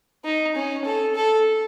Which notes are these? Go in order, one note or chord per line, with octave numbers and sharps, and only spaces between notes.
D#4
C#4
A4
A4